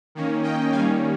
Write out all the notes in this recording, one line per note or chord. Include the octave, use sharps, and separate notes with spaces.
D#3 A#3 C#4
D#5 G5
D#3 G3 A#3 C#4 F5 G#5